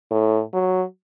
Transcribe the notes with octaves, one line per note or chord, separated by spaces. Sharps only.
A2
F#3